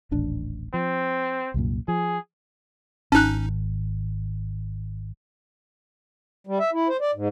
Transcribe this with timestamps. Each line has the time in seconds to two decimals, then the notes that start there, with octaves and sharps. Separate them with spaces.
0.11 D#1 A1 D4
0.74 F3 C4
1.54 C2 F#2 A#2
1.88 F3 G#4
3.12 G#1 C#4 D#4 A5 F#6
6.47 G3
6.59 E5
6.73 E4
6.88 C5
7.01 D5
7.14 G#2